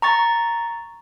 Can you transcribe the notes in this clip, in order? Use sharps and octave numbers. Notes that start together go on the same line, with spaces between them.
A#5 C#6 A6